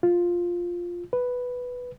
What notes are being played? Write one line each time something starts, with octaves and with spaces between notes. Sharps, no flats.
F4
B4